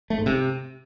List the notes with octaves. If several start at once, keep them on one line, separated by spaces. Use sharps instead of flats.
A3
G#2
C3